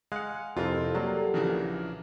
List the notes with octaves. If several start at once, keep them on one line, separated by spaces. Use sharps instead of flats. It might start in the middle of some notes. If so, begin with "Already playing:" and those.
G#3 F5 F#5 G#5 F#6
F2 C3 C4 E4 F4 G4 A4 A#4
F#3 G3 A#3 D5
A#1 C#3 E3 D4 A#4